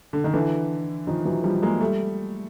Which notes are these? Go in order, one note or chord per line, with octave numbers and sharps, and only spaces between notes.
D3
D#3
D3 E3
D#3 F3
E3 F#3
F3 G3
G#3 A#3
G3 A3